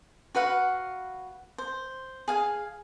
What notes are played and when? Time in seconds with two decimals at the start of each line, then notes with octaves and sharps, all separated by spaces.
0.35 F#4 B4 F5 F#5
1.58 C5
2.28 G#4 F5 G#5